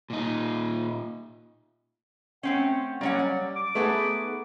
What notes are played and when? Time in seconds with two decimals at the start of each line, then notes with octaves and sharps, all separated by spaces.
0.10 A#2 D#4
2.43 A3 C4 C#4 F#5
3.01 F#3 G3 A#3 C#4 F#5
3.19 D5
3.56 D6
3.75 A3 B3 D#4 G#4 B4